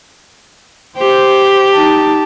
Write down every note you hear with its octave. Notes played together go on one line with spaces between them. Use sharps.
G4 C5
D#4 A5